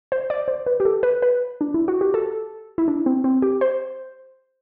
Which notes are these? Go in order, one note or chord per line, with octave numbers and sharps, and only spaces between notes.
C5
D5
C5
B4
G4
A4
B4
B4
D4
E4
F#4
G4
A4
E4
D4
C4
C4
G4
C5